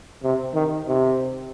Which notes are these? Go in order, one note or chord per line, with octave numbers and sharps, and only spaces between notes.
C3
D#3
C3